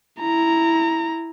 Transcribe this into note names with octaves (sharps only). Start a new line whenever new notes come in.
E4 A#5